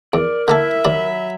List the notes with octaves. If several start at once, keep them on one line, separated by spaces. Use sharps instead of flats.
E2 A#4 D5
D3 A#3 E4 A4 E5
D#2 F#3 D5 B5